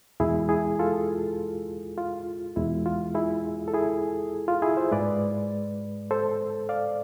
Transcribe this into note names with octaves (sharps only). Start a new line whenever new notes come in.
E2 B2 G#3 E4 G#4
E4 G#4
F4 A4
F4
E2 B2 G#3 E4
F4
E4 G#4
A4
E4 G#4
F4
E4 G#4
C5 E5
G#2 G#3 B4 D5
A4 C5
D5 F5